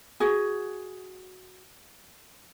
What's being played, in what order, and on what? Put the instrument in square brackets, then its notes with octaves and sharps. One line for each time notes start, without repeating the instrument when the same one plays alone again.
[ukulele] F#4 G#4